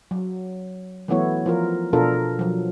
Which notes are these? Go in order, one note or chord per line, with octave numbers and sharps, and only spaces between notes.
F#3
E3 F#3 A3 B3 E4 C#5
F3 F4 A#4
B2 D4 F4 A4 A#4
F3 F#3